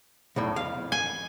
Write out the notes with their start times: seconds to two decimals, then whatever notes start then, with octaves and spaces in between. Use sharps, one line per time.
0.36 B1 E2 A2
0.56 F2 F5
0.92 G#5